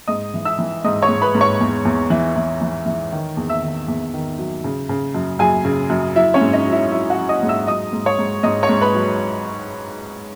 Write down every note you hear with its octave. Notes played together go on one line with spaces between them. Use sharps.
G#2 D#5 D#6
E3
E5 E6
E3
G#2 D#5 D#6
C#5 C#6
G#2
B4 B5
G#2
C#5 C#6
E2
E2
E3
E3
E3
E3
D#3
E2
E5 E6
D#3
E2
D#3
F#3
C#3
C#3
F#2
F#2 G#4 G#5
C#3
F#2
F#3 E4 E5
C#4 C#5
G#2
D#4 D#5
F#3
E4 E5
F#3 E4 E5
F#4 F#5
F#3
D#5 D#6
G#2
E5 E6
F#3 D#5 D#6
G#2
C#5 C#6
G#2
G#2 D#5 D#6
C#5 C#6
G#2
B4 B5
F#3